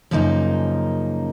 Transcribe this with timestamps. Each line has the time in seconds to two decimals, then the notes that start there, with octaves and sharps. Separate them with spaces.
0.11 F#2 C#3 F3 A#3 D#4